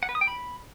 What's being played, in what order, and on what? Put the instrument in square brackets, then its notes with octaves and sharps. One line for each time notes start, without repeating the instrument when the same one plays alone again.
[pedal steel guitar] F#5
B4
D#6
G5
B5